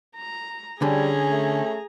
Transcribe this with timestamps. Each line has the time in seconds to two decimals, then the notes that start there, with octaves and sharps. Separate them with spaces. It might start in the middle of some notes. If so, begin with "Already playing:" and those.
0.16 A#5
0.82 D3 G3 C#4 G#4 A#5
1.31 A3